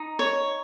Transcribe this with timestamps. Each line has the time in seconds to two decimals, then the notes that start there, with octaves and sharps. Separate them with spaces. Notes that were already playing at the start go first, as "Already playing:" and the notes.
Already playing: D#4
0.19 C#5